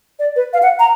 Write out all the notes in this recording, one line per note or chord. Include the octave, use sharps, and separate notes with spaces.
D5
B4
F5
F#5
A#5